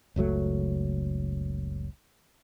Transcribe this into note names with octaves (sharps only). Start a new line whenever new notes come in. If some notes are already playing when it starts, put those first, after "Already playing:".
F#1 C#2 F#3 A3